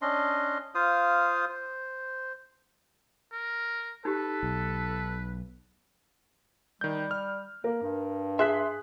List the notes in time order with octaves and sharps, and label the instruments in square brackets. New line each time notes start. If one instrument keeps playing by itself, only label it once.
[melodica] C#4 D4 D#5 C6
F4 C5 F5 D#6
C5
[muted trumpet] A#4
[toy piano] D#4 G4 [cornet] A4 [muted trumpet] B4
[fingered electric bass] B1
[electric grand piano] D#3 G6 [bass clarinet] G3
[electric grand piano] F6
[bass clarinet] A#3 [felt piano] A#4
[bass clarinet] G2
[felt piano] G#4 [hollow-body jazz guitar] E5 [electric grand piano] C6 F#6 B6